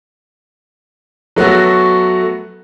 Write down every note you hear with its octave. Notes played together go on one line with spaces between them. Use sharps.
F#3 A3 B3 F#4